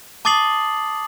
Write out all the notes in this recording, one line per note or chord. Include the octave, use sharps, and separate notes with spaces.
A5 D6 D#6 A6 C7 F#7